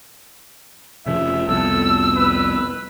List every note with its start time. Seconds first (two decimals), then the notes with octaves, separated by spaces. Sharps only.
1.06 F1 C#3 F3 E5
1.48 C2 F2 B3 A4 E6
2.17 B4